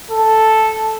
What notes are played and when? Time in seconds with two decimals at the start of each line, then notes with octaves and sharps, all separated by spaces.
0.11 A4